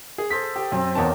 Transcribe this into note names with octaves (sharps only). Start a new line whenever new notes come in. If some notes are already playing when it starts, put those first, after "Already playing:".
G#4
G#4 A4 C5 B6
G4 A4
F#2 C4
E2 D#3 F#3 A#3 A5